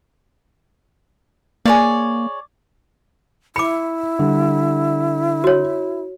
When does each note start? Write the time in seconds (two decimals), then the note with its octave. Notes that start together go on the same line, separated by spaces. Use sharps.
1.65 A#3 G#4 C#5 D5
3.56 E4 B5 D6 C#7
4.19 D3 G3
5.44 F#4 C#5